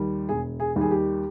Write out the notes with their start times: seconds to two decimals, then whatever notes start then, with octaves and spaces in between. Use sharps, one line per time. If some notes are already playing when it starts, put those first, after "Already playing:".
Already playing: D#2 D#3 G3
0.29 E1 G#4
0.60 G#4
0.76 D#2 D#3 G3
0.81 G#4
0.91 G4